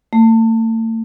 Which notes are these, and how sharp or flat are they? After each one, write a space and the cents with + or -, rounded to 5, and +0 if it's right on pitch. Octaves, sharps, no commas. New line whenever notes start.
A3 +40